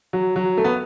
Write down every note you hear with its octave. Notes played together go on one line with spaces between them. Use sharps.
F#3
F#3
A3
B3